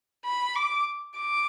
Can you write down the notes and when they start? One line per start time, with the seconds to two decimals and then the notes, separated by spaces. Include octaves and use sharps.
0.25 B5
0.55 D6
1.17 D6